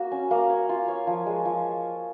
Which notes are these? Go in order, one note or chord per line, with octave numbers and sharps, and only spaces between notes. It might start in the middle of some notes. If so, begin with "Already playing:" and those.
Already playing: A#3 F#4
C#4
A#3
C#5
F4
C#5
F3
G#3
F3